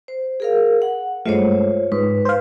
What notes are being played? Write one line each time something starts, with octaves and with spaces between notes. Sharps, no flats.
C5
G#4 A#4 F5
F#5
G2 G#3 A3 F4 C5 C#5
G#2 B4
C5 F5